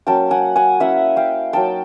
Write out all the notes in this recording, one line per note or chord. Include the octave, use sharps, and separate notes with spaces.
F#3 A#3 C#4 G5 A5
F#5 G#5
F#5 G#5
A#3 C#4 E4 E5 F#5
F5 G5
F#3 A#3 D#4 G5 A5